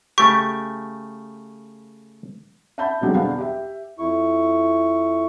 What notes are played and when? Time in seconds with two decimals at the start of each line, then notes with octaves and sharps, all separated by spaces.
0.18 C#3 A3 G4 C#6
2.78 E5 F#5 A5 B5 G6
3.01 B2 D3 F#3 G3 C4 G#4
3.14 E2 B3 D4 F5
3.38 G4 E5
3.99 F2 E4 C#6